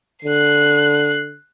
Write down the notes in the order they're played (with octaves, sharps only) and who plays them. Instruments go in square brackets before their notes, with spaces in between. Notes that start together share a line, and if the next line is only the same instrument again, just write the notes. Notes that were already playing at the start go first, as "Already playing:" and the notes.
[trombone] D3 [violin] F#6 C7